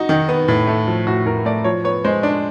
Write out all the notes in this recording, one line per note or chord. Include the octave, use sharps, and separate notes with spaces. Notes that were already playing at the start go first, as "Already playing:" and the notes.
Already playing: D#4 F#4
D#3
B3
A2
A3
F3
A2 F#4
A2 A#4
A3 D5
F3 C#5
B3 C#5
G#3 C5
D4